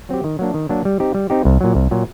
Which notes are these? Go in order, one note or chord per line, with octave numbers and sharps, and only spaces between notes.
F#3 C4 G4
D#3
F#3 A#3 D4
D#3
F#3 A#3 D4
G3
C4 D#4 G4
G3
C4 D#4 G4
C2
A#2 F#3
C2
A#2 F#3